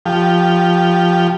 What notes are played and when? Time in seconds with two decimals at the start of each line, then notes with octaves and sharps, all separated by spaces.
0.06 F3 G4